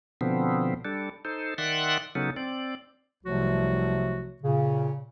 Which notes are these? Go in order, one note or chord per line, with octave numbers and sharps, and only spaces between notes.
B2 D3 F3 B3 C4
G3 D4 A4
D#4 A4 C5
D#3 D5 E5 F#5 C6 F#6
C#3 F#3 B3 C#4 D#4 A4
C4 D5
C2 C3 F3 F#3 A3 F#4
A#2 C#3